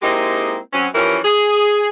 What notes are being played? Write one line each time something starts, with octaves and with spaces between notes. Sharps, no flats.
G#3 A#3 C4 D#4 E4 G4
F#2 F#3 C4 C#4
E3 F3 C#4 E4 G4 A#4
G#4